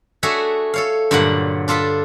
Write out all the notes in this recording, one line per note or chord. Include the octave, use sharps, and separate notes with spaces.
A3 D4 F#4 G#4 C#5 E5
A4 C#5 F5
G2 A#2 D3 F#3 F#5
D4 F4 A4 A5 B5